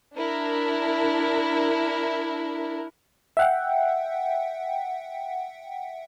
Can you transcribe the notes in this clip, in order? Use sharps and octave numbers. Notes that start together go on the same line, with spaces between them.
D4 E4 A#4
E5 F#5 G5